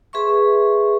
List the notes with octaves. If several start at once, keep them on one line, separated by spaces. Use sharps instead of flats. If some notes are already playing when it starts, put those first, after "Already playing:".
G#4 B4 E5 C6 C#6